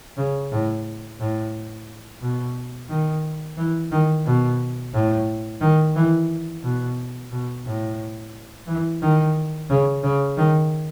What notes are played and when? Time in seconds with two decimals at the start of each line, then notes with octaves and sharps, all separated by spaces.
0.17 C#3
0.52 A2
1.19 A2
2.21 B2
2.89 D#3
3.57 E3
3.91 D#3
4.25 B2
4.93 A2
5.61 D#3
5.95 E3
6.63 B2
7.31 B2
7.65 A2
8.67 E3
9.01 D#3
9.69 C#3
10.03 C#3
10.37 D#3